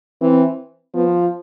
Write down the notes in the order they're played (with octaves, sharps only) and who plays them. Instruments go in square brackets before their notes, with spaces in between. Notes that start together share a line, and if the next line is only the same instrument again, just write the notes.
[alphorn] E3 [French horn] C4
[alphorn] F3 [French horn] B3